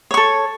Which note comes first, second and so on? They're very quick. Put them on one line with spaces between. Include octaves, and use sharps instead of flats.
C#5 C#6 A4